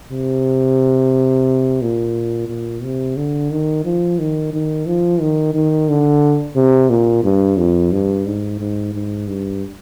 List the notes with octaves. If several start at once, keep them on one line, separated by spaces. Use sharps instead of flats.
C3
A#2
A#2
C3
D3
D#3
F3
D#3
D#3
F3
D#3
D#3
D3
C3
A#2
G2
F2
G2
G#2
G#2
G#2
G2